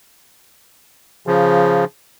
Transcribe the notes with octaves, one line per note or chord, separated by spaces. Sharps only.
C#3 F3